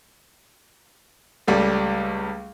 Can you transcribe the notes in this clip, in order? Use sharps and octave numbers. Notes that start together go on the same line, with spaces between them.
C#2 G3 A3